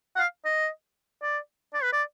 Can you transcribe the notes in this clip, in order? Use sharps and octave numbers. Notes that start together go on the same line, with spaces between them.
F#5
F5
D#5
D5
D5
B4
D5